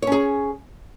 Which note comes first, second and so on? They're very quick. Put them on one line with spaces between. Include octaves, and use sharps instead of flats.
C#5 C#4 G#4